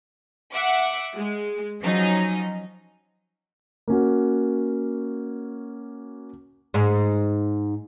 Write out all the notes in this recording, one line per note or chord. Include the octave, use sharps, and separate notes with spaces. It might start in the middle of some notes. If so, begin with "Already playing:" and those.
E5 F#5 D6
G#3
F3 F#3 C#4 D#4
A#3 C#4 F#4
G#2